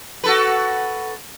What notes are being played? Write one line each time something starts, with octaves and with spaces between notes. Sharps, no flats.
F#4 A4 B4